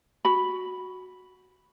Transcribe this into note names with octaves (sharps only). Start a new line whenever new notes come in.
F#4 B5